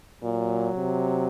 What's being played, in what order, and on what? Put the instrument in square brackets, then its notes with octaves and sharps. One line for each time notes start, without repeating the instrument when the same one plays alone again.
[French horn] A#2 [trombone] F#3
[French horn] C3